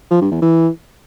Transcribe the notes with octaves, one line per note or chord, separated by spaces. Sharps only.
F3
G2
E2
E3